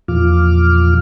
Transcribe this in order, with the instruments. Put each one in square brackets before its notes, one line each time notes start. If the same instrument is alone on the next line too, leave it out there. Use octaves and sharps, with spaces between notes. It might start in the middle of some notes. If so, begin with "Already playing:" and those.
[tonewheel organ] E2 A#2 F3 F4 D6 F6